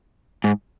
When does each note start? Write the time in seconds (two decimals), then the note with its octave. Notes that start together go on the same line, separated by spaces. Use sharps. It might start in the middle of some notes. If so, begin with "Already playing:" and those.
0.44 G#2